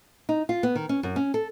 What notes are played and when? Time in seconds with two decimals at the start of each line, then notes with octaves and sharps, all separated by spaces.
0.29 D#4
0.49 F4
0.63 B3
0.76 D#3
0.89 C#4
1.03 F#2
1.16 C#4
1.34 A4